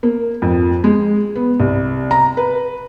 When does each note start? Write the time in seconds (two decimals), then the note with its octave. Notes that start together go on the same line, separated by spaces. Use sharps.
0.03 A#3
0.42 F2
0.84 G#3
1.36 B3
1.60 C2
2.11 A#5
2.37 B4